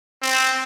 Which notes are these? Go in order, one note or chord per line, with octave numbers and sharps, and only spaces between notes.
C4